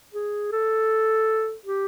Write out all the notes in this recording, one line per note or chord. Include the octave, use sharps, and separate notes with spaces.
G#4
A4
G4